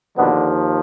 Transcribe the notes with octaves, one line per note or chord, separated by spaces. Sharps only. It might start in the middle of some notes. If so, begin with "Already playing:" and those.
D#2 B2 D3 F3 B3